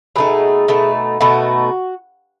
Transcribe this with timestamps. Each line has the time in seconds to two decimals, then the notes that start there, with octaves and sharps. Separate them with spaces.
0.16 B2 A3 D#4 G#4
0.68 B2 A3 D#4
1.21 B2 A3 D#4 F#4